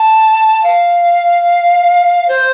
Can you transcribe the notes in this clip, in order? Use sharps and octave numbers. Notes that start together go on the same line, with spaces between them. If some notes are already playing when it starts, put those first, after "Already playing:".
Already playing: A5
F5
C5